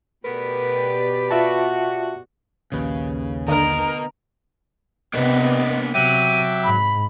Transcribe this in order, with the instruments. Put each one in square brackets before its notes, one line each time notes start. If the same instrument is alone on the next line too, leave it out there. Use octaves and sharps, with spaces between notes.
[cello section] B2 G4 D5 [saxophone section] A3 B3 A#4 [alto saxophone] B4
[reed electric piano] F4 E5 A5 [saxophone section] F#4
[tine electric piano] A#1 D#2 B4 [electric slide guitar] C#3
[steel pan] D3 [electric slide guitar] B3 D#5 [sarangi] A#4
[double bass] C3 B3 [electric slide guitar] A#3 D4 B4 [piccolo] D#5
[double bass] C3 [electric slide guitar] F#3 [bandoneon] E5 G5 D6 [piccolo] D#7
[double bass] G#2 [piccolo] B5